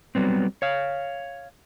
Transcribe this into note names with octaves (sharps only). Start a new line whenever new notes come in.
F#3 G3 B3 C4
C#5 F5